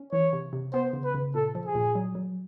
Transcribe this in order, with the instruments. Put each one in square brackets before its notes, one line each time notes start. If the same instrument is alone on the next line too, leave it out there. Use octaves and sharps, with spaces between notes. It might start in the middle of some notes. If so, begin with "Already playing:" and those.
Already playing: [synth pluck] C#4
[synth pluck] E3 [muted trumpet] C#5
[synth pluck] C3
C3
[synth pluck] B3 [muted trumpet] C5
[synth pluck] C#3
[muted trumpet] B4
[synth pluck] C#3
[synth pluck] A#2 [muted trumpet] A4
[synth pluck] F3
[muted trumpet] G#4
[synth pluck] A#2
F#3
F#3